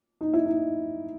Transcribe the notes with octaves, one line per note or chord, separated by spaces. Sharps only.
D#4
E4
D#4